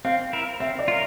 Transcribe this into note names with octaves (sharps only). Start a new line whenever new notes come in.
C4 F5
E4 A#4
C4 E5
D5
F4 A#4